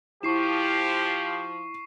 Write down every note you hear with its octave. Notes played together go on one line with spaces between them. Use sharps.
F3 E4 G4 C#6 C7 E7